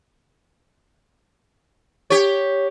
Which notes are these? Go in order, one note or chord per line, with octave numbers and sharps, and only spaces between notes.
G4 C#5